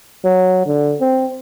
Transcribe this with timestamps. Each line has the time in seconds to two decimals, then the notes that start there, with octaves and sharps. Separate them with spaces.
0.25 F#3
0.66 D3
1.01 C4